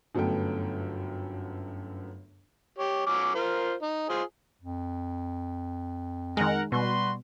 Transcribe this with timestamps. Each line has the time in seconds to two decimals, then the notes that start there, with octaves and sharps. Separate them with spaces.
0.15 G1 F#2 A3 B3 A4 G5
2.78 G4 C#5
3.07 F#3 C#4 D6
3.35 F4 A#4 C5
3.82 D#4
4.09 F4 G#4 C5
4.62 F2
6.37 D#3 G#3 A#4 F#5
6.72 B2 G3 F#4 B4 C6